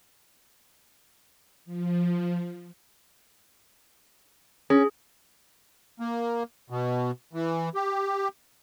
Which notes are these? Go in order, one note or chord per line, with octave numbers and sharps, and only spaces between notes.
F3
C#4 G#4
A#3
B2
E3
G4